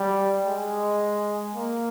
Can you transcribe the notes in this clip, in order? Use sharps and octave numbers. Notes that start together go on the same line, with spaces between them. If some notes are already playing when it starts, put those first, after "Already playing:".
Already playing: G3
G#3
A#3